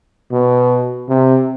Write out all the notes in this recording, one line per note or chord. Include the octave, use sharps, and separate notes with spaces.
B2
C3